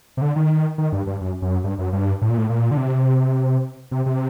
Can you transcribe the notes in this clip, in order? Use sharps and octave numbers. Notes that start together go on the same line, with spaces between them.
C3
D3
D#3
D#3
G2
G2
F#2
F#2
G2
F#2
G2
A2
A#2
A2
A#2
D3
C3
C3
C3